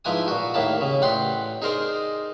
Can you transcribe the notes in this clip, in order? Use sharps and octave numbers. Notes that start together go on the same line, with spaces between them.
G#2 F3 E4 B4 G#5 D#6
A#2 F#4
D#2 A2 A#3 A5 B5
C#3
A1 D5 F#5 G5 B5 C6
D#4 G#4 A#4 C5 D5 D#5